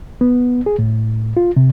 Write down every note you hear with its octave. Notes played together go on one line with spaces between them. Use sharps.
B3
G#4
A2
F4
C3